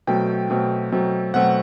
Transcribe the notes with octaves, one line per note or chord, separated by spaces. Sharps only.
B2 F#3 A3 C4 G5
B2 F#3 A3 C4
B2 F#3 A3 C4
B2 F#3 A3 C4 F#5